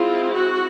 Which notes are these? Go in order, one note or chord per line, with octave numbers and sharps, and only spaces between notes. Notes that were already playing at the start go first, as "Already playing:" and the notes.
Already playing: G#3 C4 E4 F4
F#4